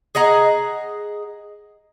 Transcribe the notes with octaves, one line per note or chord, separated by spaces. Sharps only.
G#4 D#5 F#5 A#5